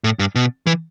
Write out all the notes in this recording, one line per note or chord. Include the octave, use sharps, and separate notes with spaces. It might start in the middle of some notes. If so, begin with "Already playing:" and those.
A2
G2
B2
E3